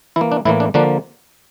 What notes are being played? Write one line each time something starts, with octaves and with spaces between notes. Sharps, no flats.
E3 A#3 E4
D4
A2 E3 A#3 E4
D4
D3 F3 A#3 D4